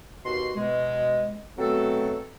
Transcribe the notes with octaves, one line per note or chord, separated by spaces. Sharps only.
D#2 B2 F#4 C6
B2 G#3
B2 F#3 A3 C4 A4